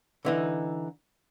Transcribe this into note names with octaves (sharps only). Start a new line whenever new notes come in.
D3 E3 D#4